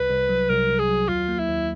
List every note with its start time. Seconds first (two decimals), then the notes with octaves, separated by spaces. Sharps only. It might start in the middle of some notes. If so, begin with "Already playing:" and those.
Already playing: C2 B4
0.10 C2
0.29 F#3
0.49 C2 A#4
0.69 C2
0.79 G#4
0.89 F#3
1.09 D#2 F4
1.28 A#3
1.39 E4
1.49 D#2